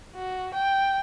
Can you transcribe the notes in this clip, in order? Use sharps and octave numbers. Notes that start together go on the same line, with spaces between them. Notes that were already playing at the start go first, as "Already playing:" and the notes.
F#4
G5